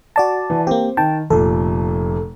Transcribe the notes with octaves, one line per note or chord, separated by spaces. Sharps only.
F#4 D5 A5
E3
A#3 C4 G4
D#3 G5 A5
F1 A#2 A4